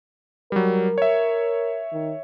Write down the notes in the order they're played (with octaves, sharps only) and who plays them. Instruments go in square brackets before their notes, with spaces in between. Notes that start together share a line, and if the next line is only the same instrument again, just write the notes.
[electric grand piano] F#3 G3 [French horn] A#4
[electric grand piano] C#5 E5
[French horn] D#3